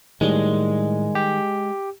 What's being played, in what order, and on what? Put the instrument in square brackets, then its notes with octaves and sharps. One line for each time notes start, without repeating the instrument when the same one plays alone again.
[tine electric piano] A2 [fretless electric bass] D#3 G3 [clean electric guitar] G#3
[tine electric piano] G4